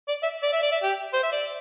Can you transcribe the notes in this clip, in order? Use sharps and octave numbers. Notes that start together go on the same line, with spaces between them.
D5
E5
D5
E5
D5
E5
G4
C5
E5
D5